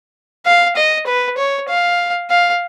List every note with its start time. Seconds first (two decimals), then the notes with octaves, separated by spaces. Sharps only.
0.46 F5
0.76 D#5
1.07 B4
1.37 C#5
1.69 F5
2.30 F5